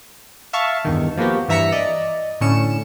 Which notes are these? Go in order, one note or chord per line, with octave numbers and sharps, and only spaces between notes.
E5 F5 A5 C#6
E2 G2 D#3
F3 A#3 B3 F#4 G4
G2 E3 E5 A#5 B6 C#7
D5 D#5
A2 D3 C#4 C#7 E7